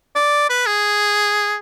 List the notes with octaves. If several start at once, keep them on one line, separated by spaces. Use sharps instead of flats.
D5
B4
G#4